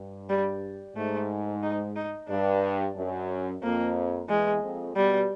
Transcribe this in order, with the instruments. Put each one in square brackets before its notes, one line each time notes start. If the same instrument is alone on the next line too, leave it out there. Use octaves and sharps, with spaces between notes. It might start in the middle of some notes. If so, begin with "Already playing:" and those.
Already playing: [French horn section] G2
[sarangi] G3
[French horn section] G#2 [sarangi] A3
[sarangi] D#4
D#4
[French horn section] G2 [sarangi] D4
[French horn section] F#2
[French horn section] F2 [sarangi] A#3
[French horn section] E2 [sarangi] G#3
[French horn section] F2
[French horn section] B2 [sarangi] G3